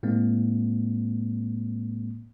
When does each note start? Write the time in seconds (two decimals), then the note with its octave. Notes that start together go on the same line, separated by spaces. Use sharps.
0.03 A2 G#3 A#3 C4